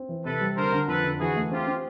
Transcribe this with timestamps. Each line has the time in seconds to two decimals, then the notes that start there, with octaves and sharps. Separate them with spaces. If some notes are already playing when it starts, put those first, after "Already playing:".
Already playing: C4
0.09 E3
0.25 C3 A4 B4
0.41 G3
0.57 D3 A#4 C5
0.72 D3
0.88 F2 A4 B4
1.04 D3
1.20 E3 F#4 G#4
1.36 A3
1.51 C4 F4 G4
1.67 C4